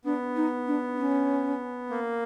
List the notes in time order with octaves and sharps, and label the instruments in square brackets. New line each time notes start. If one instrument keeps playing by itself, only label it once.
[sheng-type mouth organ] B3 [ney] D4
[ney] D#4
D4
C#4
[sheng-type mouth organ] A#3